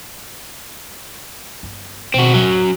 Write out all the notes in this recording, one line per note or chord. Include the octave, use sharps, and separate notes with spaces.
G1
B2 C4 F#4
D1 F#2 F#3